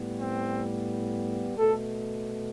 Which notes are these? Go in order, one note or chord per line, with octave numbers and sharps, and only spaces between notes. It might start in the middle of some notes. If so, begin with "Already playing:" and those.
Already playing: A2 G3 B3
C4
B2 A3 A4